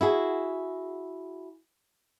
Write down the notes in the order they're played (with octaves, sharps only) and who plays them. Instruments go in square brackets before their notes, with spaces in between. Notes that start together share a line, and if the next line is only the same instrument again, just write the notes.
[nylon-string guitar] E4 F#4 G#4